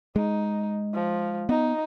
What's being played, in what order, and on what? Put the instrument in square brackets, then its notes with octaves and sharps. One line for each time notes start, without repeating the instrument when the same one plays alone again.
[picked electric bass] G#3 [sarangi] D#4
[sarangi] F3
[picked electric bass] B3 [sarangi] D#4